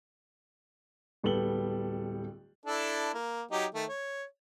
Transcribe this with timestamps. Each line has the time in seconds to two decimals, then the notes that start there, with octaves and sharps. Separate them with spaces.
1.24 D1 G3 B3 A4 F#7 G7
2.66 D4 E4 A4
3.14 A#3
3.51 F#3 D#4 G4
3.74 D#3 A3
3.89 C#5